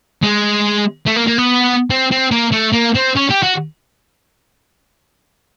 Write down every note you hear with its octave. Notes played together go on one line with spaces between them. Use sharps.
G#3
A3
A#3
A#3
B3
C4
C4
A#3
A3
A#3
C4
C#4
G4
F#4